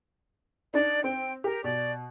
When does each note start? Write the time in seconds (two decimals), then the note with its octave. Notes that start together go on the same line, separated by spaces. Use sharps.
0.74 D4 D#4 D5
1.04 C4 G5
1.44 G4 A#4
1.64 B2 D5